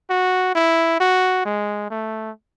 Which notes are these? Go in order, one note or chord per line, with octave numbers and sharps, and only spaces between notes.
F#4
E4
F#4
G#3
A3